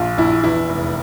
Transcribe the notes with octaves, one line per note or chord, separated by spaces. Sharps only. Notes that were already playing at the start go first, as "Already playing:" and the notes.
Already playing: A#1 F4
A#1 E4
E2 E4
F1